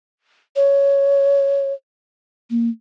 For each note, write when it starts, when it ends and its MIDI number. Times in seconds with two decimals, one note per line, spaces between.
0.56 1.73 73
2.50 2.69 58